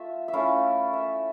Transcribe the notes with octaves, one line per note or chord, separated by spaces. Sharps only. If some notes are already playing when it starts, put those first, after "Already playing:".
Already playing: A3 F4 E5
E5
A3 C#4 E4 F5
E5